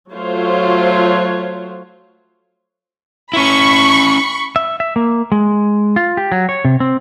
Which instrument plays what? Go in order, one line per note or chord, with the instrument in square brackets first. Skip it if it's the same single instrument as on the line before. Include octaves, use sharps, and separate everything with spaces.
[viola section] F#3 A3 F4 C5 C#5
[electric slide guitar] C#4 E4 [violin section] B5 C#6
[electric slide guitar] E5
E5
A#3
G#3
F4
G4
F#3
C#5
C3
C4